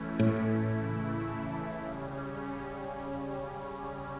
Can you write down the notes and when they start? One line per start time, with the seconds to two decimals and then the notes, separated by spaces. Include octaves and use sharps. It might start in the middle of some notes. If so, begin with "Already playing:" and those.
Already playing: E3 A3 C#4 E4
0.19 A2
0.74 C#3 E3 A3 E4
1.85 C#3 G3 C#4